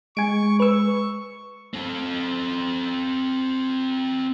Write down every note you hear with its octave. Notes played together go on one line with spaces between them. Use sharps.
G#3 G#5 C#6 D7
B4 C#6 E6
C4 A4